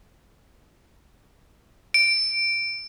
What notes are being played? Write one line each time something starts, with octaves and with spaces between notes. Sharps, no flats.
D7